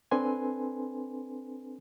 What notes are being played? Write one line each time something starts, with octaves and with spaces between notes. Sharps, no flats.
C4 D4 A4 B4 G#5 C6